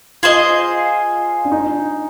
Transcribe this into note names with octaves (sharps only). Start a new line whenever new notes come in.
F4 G#4 C5 D#5
D4
D#4